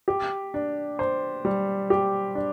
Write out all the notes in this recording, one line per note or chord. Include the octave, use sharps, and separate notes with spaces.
G4
D4
C5
G3
G4
D4